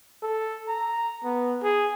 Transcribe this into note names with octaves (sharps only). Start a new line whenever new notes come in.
A4
A#5
B3
G#4